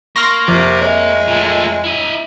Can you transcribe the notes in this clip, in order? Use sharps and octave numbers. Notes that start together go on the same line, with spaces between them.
A#3 C6 C#6 F6 A#6
F2 C3
G#3 C#5 E5
A#2 A3
E4 D#5